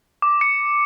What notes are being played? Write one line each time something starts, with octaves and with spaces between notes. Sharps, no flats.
D6
C#7